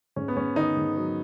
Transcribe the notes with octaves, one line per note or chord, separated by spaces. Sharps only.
G#2 C#4
B3
G#2 C#4
D#3 D#4
G#2
F#3